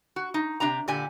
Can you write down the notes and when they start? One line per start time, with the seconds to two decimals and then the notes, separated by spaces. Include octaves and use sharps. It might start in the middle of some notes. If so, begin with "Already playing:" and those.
0.16 F#4
0.34 D#4
0.60 C3 D4 G4 A#5
0.88 A#2 D3 G4 D5 G#5